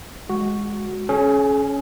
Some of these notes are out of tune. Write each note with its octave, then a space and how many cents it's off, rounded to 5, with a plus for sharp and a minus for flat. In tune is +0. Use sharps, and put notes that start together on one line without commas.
G#3 +0 F#4 +0
C#4 +0 G#4 +40